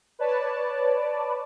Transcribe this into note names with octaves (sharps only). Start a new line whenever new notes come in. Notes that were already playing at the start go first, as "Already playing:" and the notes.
B4 C#5 D5 A5